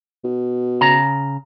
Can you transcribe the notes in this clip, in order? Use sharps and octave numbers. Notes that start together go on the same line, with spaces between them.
B2
C#3 A#5